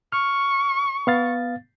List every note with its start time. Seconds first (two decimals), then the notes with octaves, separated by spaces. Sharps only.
0.12 C#6 F6
1.07 B3 F5 A6